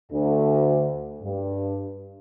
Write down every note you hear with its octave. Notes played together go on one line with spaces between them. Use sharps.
D2
G2